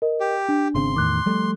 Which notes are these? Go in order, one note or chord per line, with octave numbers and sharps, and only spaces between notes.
A#4 D#5
G4
D4
G#1 C#3 C4 C6
E2 A2 D#3 D6 F#6
F3 G3 A3